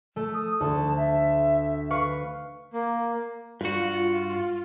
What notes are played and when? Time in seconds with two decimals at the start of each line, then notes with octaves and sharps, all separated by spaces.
0.16 A3
0.34 D#6
0.60 D2 A5
0.97 E5
1.90 B4 F5 C#6
2.73 A#3
3.61 G2 F4 F#4
4.29 F4